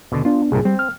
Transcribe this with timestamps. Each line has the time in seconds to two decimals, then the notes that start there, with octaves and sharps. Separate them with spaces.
0.12 D#2 B2 D3
0.25 B3 D4 F4
0.52 C2 G2 A#2 G#4
0.65 G3 C4
0.79 F6